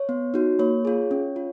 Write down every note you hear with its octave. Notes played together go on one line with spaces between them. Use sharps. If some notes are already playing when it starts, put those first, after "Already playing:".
Already playing: C#5
B3
D#4 F#4
A#3 C#5
F4 G#4
C#4
F4